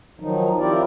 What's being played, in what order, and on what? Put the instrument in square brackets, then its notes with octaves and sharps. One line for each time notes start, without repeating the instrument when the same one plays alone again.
[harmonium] D#3 F3 F#3 D#4
C4 E4 F4 G4 A#4 D5